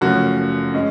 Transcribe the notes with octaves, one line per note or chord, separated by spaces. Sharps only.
F#1 F#2 F3 A3 C#4 F#4
G#3 C#4